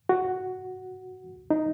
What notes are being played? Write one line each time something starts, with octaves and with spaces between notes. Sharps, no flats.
F#4
D#4